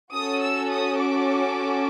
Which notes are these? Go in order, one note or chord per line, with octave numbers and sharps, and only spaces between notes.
C#4 F#4 A4 D#6
E6
D#6
D6